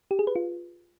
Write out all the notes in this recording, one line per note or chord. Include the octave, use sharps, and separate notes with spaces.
G4
G#4
B4
F4